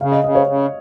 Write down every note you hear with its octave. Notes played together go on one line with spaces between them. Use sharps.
C#3 F5
D#5
C#3 D#5
C#5
C#3